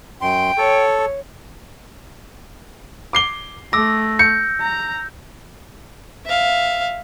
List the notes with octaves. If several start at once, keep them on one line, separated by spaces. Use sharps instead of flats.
F#2 G5 C6
A4 C#5
D6 C7 G7
A3 D6 E6 A#6
G6 C#7
A#5
E5 F5